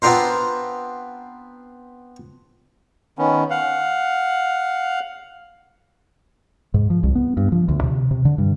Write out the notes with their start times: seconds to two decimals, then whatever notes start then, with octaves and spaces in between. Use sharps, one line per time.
0.02 B3 C4 D4 F4 A#4 C5
3.19 D#3 B3 C#4
3.50 F5 F#5
6.74 G#2
6.90 F3
7.03 C2
7.15 B3
7.37 G2
7.52 F3
7.69 D2
7.83 C3
8.11 C3
8.25 D3
8.38 G2